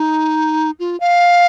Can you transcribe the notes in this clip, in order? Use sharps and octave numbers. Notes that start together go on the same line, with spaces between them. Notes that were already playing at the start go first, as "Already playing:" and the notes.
Already playing: D#4
F4
F5